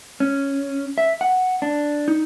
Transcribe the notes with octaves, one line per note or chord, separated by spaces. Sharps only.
C#4
E5
F#5
D4
D#4